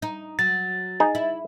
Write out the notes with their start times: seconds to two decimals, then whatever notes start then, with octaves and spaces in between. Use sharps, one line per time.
0.02 D#4
0.39 F#3 A6
1.00 D#4 G#4
1.15 E4